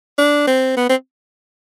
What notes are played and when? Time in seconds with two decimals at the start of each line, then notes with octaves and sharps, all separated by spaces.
0.18 D4
0.47 C4
0.77 B3
0.89 C4